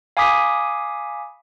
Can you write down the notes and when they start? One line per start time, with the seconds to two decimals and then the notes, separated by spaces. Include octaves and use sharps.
0.17 F5 G#5 B5 D6 D#6 B6